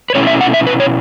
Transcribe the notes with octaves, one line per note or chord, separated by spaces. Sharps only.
B4
B2 A3 C#4 E4 C#5
E5
F#5
E5
B4
C#5